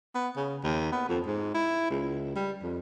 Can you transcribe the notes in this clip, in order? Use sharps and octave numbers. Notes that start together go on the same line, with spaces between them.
B3
C#3
D#2
B3
F2
G#2
E4
C#2
G3
F2